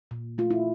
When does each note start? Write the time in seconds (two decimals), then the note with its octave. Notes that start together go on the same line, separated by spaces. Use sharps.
0.11 A#2
0.38 A3 F4
0.50 E4